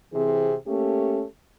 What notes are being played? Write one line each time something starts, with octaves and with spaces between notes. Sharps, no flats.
C3 E3 C4 G#4
A3 A#3 C#4 G4 A4